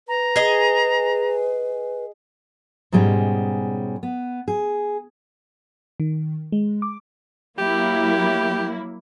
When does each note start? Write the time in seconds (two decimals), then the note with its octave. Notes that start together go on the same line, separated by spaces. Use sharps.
0.08 B4 A#5
0.36 G#4 D#5
2.92 G#2 B2 G3 G#3 C#4
4.03 B3
4.48 G#4
6.00 D#3
6.52 G#3
6.82 D6
7.58 F#3 A#3 E4 G4